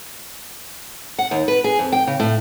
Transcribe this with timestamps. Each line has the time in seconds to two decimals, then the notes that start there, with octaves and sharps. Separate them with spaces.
1.19 F#5
1.31 D#2
1.48 B4
1.64 G#4
1.79 F2
1.92 G5
2.07 C#3
2.20 A2